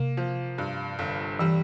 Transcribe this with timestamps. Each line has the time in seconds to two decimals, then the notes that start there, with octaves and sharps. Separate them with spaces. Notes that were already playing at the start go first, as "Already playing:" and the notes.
Already playing: C3 A#3
0.17 F3
0.58 G2
0.99 G1
1.39 E3 G3